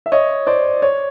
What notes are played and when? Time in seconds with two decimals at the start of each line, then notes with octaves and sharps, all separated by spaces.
0.06 E5
0.12 C#5 D#5
0.47 C5 D5
0.82 C#5